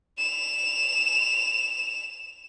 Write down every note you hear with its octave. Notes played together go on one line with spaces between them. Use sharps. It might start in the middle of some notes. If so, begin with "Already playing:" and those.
E7 F7